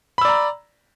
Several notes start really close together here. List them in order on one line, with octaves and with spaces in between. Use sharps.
B5 E6 D5 A#5